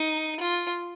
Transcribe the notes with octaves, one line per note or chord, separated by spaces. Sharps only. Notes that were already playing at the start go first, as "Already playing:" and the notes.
Already playing: D#4
F4